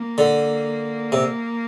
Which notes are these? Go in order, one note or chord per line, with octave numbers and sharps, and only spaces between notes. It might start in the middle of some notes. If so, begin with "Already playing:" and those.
Already playing: A#3
D3
C3